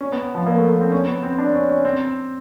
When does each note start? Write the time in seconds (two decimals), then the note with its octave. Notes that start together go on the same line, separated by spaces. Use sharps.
0.01 C#4
0.12 B3
0.35 F3
0.47 A#3
0.58 A3
0.69 A#3
0.81 C4
0.92 C#4
1.08 B3
1.23 C4
1.38 D4
1.54 C#4
1.69 C#4
1.85 C4